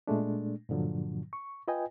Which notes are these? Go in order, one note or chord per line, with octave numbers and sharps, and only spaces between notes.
A#2 G#3 A3 D4
G2 A#2 D3 F3 F#3
C#6
F4 B4 D#5 G5 G#5